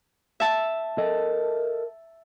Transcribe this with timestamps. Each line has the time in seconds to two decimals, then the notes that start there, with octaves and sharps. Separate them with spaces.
0.40 E5 A5
0.98 A4 A#4 D#5